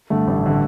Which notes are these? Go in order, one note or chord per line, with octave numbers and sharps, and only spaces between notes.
G2 D3 A3
A1
D3 A3